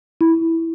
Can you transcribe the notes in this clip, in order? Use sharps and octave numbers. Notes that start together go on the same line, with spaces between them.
E4